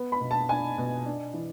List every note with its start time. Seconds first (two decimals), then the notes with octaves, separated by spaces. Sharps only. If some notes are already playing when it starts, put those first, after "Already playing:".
Already playing: B3
0.12 B5
0.21 B2
0.31 A5
0.49 D4 G#5
0.78 B2
1.06 D4
1.34 E3